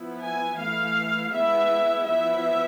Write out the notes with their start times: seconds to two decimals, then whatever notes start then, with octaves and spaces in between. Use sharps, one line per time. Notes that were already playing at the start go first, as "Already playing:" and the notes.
Already playing: F3 B3 E4
0.21 G#5
0.57 E3 A3 E4 F5
1.32 G#3 B3 E4 E5
2.05 F3 B3 E4 E5